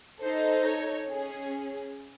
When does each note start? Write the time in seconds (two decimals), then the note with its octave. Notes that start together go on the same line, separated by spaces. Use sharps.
0.21 D#4 A4 C5
0.64 C#5
1.08 C#4 G#4